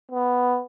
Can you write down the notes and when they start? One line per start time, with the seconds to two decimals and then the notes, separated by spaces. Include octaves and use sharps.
0.12 B3